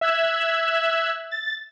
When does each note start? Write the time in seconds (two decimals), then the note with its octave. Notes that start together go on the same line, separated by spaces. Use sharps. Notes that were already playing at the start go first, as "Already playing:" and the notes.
0.01 E5 E6 F#6 G#6
1.31 A6